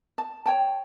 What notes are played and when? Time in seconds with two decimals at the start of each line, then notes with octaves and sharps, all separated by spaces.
0.18 A5
0.46 C#5 G5 A5